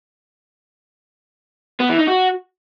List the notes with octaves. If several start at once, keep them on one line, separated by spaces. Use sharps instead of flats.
B3
E3
D#4
F#4